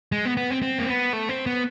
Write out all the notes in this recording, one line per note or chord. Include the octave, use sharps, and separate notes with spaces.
G#3
B3
B3
C4
C4
A#3
B3
A3
C4
B3